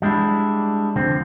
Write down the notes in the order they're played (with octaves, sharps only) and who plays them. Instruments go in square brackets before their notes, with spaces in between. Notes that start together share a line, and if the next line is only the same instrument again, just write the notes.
[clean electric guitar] G3 G#3 D4 E4
F2 D3 F3 C4